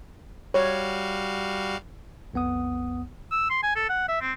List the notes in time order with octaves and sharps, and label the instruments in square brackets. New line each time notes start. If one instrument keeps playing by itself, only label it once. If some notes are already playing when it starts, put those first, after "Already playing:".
[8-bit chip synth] G3 F#4 F5 [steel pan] C#5
[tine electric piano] B1 F2 B3 F#5 D#6
[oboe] E6
C6
G#5
A4
F#5
E5
C4